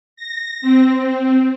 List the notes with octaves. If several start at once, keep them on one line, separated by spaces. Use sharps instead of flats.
A#6
C4
C4